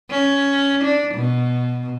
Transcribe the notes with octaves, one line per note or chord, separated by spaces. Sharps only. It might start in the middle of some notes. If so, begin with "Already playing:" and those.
C#4
D4
B2